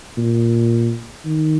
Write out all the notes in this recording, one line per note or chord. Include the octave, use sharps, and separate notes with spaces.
A#2
D#3